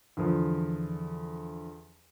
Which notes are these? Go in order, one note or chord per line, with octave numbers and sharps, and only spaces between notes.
E2 D3 F3